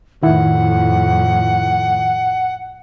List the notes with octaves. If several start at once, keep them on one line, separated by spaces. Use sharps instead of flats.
F2 A2 D#3 E4 F#5